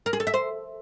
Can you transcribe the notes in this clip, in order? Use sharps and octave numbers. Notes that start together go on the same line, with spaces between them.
A#4
G#4
A4
E5
C5